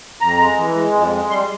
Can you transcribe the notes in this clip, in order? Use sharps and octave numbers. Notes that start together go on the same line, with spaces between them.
F2 A#5
G#3
E3
G#3
F2
G#3
G3 C6